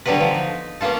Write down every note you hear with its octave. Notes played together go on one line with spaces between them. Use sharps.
D3 F#3 G3 B3 B4
F3
D#4
A#3 B3 C#4 F4 A4